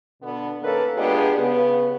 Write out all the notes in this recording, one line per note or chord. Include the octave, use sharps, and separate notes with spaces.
B2 D3 B3
D#3 A#3 C#4 A4 B4 C#5
G#3 B3 D4 F4 G4 G#4
C#3 B3